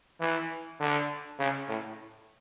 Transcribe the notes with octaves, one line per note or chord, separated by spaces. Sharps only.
E3
D3
C#3
A2